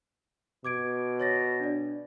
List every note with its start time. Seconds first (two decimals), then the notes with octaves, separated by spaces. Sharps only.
0.64 B2 D6 G#6 D7
1.20 C#5 A6 A#6
1.60 D4 D5